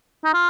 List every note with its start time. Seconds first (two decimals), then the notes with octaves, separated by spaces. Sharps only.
0.25 D#4
0.34 F4